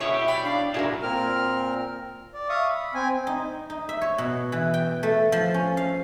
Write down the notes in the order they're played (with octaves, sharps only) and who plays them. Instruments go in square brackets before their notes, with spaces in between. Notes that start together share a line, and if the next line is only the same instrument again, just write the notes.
[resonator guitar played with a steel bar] B2 E4 C#5 [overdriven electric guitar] G#4 F#5 [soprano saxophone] E5
[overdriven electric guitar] G4
[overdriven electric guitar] D5 [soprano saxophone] G5 [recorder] B5
[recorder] D4 [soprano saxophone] F5
[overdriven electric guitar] G2 A#2 [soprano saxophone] D4 [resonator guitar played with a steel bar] E4 G#4 A#4 [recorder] F#4
[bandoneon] A#2 C4 A#4 F6
[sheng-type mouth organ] D5
E5 F5 C#6 D#6
B5
C4 G#5
[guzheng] D#4
D#4
E5
C#5
B2
E3
G5
A3
F3
C#4
F5